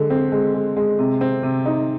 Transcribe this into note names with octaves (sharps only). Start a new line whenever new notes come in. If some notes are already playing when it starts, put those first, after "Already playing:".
Already playing: D3 G#3
C4
G#3
G#3
G#3
C3
C4
C3
D#4